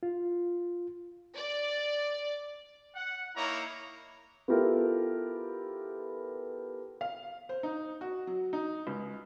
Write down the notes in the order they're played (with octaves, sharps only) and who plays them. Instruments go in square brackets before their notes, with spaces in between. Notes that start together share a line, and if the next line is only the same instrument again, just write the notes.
[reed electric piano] F4
[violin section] D5
[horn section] F#5
A#3 D#4 E4 C#5 A#5
[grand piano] B3 E4 F4 G4 A4 A#4
[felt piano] F5
C5
D#4
F#4
F#3
D#4
C#2